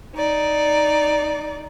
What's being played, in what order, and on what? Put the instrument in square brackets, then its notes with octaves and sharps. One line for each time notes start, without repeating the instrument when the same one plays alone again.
[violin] D#4 D5